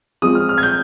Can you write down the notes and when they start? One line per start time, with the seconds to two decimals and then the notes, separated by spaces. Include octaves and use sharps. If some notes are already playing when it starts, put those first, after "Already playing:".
0.22 F3 G#3 C4 F4 D#6
0.35 F6
0.49 F6
0.58 G#6
0.63 G6